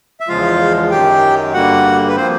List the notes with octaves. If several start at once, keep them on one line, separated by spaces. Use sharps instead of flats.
E5
E2 C#3 F3 G#3 F4 F5
F#2 D#3 F#3 G4 G5
G2 D3 G3 A#3 F#4 F#5
B4
F3 A#3 C4 C5